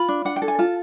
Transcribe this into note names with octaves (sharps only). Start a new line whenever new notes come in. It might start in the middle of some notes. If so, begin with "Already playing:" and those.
Already playing: F4 B5
D4
D4 F#5
G5
A4
G#5
F4 A5